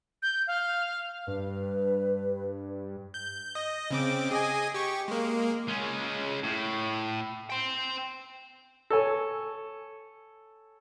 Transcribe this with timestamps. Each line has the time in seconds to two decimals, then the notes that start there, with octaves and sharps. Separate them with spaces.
0.22 G6
0.47 F5
1.27 G2 B4
3.14 G6
3.55 D#5
3.91 C#3 C4 D6
4.31 G#4 D#5 G#5
4.74 G4 C#6
5.08 G#3 A#3
5.68 G#3 C#4
6.44 A2
7.50 G5 C6
8.90 A4 C#5 G#5